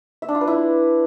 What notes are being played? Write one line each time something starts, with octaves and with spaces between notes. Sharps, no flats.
E5
D4
F4
B4
E4